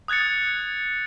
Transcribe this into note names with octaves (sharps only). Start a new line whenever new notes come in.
D#6 F#6 G#6 A6 C#7